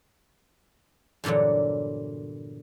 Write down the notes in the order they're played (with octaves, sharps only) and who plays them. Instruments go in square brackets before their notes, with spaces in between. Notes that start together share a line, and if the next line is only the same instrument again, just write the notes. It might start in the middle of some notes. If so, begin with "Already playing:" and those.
[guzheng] E2 G2 A#2 D3 F#3